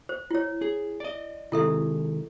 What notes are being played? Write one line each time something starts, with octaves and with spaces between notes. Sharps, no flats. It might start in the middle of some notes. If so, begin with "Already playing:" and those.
C5
E4 C#5
G#4
D5 D#5
C3 D#3 G#3 E4 A4 E5